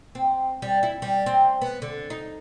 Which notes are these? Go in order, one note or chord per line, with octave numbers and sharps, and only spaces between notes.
C4
G3
E4
G3
C4
B3
D3
D#4